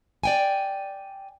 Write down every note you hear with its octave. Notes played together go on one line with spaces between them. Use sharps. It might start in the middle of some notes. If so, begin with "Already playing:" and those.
D5 G5 G#5